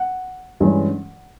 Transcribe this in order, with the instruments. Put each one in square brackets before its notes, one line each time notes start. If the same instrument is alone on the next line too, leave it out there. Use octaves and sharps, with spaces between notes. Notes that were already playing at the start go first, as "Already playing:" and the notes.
Already playing: [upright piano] F#5
G2 E3 G#3 C#4